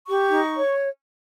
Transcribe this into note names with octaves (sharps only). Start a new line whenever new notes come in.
G4 C#6
D#4
C#5